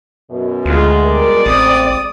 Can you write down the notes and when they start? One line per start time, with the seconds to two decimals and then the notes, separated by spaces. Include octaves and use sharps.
0.30 F#2 B2
0.65 D2 G#3 F4
1.04 B2 G3 A#4 D5
1.46 A1 C4 D#6